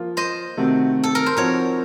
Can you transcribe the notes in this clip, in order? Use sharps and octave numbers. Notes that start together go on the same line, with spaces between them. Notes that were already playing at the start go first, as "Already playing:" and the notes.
Already playing: F3 A#3 F4
C5 D#5
C3 D#3 A3 C4 F#4
A4
A#4
C5
F3 C4 D#4 F#4 A#4 C#5